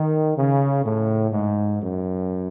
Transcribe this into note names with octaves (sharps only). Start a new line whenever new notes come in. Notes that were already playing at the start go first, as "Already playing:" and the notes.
Already playing: D#3
C#3
A2
G#2
F#2